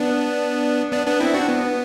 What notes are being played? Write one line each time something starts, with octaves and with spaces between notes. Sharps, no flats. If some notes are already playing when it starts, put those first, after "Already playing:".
Already playing: B3 D4
B3 D4
B3 D4
C4 E4
D4 F#4
B3